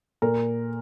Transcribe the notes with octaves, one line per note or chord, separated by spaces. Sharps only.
A#2 A#4